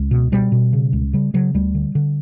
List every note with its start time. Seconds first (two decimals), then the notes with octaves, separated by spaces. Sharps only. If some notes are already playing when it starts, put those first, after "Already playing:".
Already playing: C#2
0.11 B2
0.32 B2 G3
0.52 B2
0.73 C#3
0.93 C#2
1.13 C#3 G3
1.34 C#3 F#3
1.54 D2 G3
1.75 D3
1.95 D3